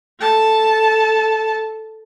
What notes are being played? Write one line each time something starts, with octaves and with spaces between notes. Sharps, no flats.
A4 A5